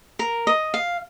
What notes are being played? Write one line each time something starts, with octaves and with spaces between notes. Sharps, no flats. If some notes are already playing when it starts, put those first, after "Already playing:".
A#4
D#5
F5